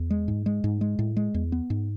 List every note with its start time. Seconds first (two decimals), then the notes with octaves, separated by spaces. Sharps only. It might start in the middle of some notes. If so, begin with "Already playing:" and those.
Already playing: E2
0.10 G#3
0.28 G#2
0.46 G#3
0.64 G#2
0.81 G#3
0.99 A2
1.17 G#3
1.34 E2
1.52 B3
1.70 G#2